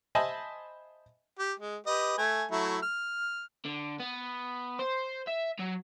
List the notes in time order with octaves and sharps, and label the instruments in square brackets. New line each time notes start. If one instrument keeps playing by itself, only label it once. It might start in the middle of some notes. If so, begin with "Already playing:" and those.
[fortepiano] C5 D#5 E5 G#5 A5 B5
[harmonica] G4
G#3
G4 B4 D#5
A3 G#5
F#3 A3 E4
F6
[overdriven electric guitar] D3
B3
C5
E5
F#3